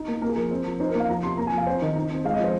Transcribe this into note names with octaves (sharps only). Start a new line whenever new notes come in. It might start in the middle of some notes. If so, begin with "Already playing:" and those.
Already playing: D#4
A#3
A#3 A#4
G#4
F3 A#4
C4
F3
D#4 C5
A#4
A#3
F5
F3 A#5
C3 C6
A#3 A#5
G#5
F3
F5
C4 C5
D#3
D#4
C4
G#3 F5
D#5
F3 C5